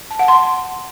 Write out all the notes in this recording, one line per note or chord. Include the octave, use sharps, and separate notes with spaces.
A5
F#5
C6